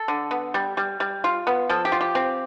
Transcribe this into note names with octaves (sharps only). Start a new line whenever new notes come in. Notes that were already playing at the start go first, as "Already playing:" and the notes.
Already playing: A4
D3
B3
G3
G3
G3
F4
B3
F3 A4
G4
F4
G4
C4